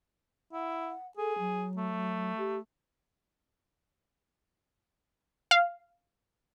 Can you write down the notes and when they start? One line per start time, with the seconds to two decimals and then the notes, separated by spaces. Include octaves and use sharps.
0.52 E4 F#5
1.17 G#4 A4
1.38 F#3
1.77 A3
2.37 G4
5.51 F5